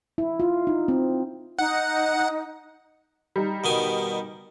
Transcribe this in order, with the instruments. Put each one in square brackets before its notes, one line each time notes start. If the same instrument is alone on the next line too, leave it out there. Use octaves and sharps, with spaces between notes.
[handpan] E4
F4
D#4
C4
[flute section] D#4 [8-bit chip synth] F#5
[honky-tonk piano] G3 D#4
[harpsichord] B2 D#3 G#5